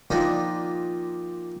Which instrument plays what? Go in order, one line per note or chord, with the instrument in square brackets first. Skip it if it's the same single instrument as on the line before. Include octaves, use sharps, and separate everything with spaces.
[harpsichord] A#2 D#3 F3 A#3 D4 D#4